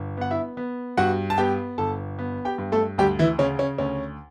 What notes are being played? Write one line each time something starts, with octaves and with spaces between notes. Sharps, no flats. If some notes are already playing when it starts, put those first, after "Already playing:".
Already playing: G1
B3 F#5
E4 E5
B3
G2 F#4 F#5
A5
B3 G4 G5
G1 A4 A5
B3
G4 G5
G2
A3 A4
D2 G3 G4
E3 E4
C#3 C#4
C#4
D2 C#4